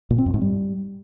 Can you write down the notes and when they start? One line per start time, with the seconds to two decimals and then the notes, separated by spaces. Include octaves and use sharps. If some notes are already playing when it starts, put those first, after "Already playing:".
0.10 A#2
0.18 C4
0.26 F#2
0.34 G#2
0.41 G3